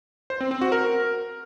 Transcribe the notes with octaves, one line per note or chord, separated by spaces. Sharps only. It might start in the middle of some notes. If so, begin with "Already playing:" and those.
C5
C4
C4
F#4
A#4